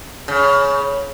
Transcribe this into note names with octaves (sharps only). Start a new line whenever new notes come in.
C#3